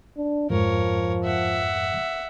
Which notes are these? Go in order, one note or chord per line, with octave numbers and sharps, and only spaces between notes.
D4
F2 G#2 F3 A#4 C#5
E5 F#5